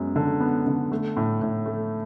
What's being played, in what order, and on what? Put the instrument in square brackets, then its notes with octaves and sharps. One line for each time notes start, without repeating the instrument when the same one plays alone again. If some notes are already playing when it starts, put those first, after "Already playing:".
Already playing: [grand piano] F#2 G#3 B3
D3
B3
D3
A3
A2
A2
A3